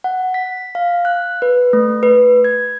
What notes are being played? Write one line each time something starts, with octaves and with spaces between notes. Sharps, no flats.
F#5
B6
F5
F#6
B4
A3
B4
G#6